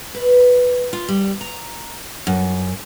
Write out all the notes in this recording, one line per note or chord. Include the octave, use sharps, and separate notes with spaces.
B4
F4
G3
A#5
F#2